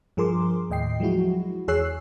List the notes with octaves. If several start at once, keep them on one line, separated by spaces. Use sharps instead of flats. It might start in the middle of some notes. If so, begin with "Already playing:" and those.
G2 F3 G#4 A#4 C6 D6
D#2 A2 D#5 G5 C7
F3 F#3 G#3 E4 F#4
E2 G#4 C#5 E6 F#6 C7